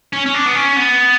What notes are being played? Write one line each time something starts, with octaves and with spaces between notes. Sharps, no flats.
C#4
C#4
D4
B3
C#4
B3